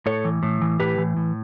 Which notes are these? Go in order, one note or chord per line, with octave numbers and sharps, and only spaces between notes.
A2 A4 C#5
E3
A2
E3
A2 G4 B4
E3
A2